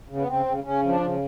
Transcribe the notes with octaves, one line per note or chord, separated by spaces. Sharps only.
C#3
B3
C#3 C4
C#3
C#3 C#4
F3 C#4
D4
C#3